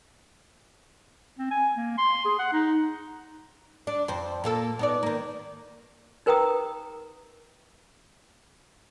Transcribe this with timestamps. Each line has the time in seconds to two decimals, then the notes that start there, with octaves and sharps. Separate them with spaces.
1.39 C4
1.51 G#5
1.77 A#3
1.98 C6
2.25 G#4
2.39 F#5
2.53 D#4
3.87 D4
4.08 F2 C5
4.44 A#2 A#3 A4
4.79 B3 D#4 D5
5.03 D#3 A#3
6.26 D#4 A#4 B4 G5 A#5 D#6